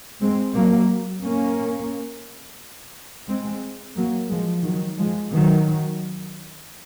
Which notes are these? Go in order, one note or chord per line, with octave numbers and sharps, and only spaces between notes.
G#3 C4
F#3 A#3
A#3 C#4
G#3 C4
F#3 A#3
F3 G#3
D#3 F#3
F3 G#3
D#3 F#3